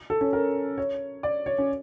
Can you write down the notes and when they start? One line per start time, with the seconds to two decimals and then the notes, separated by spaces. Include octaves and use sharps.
0.10 A4
0.21 C#4
0.33 A#4
0.78 C#5
1.23 D5
1.46 C#5
1.58 C#4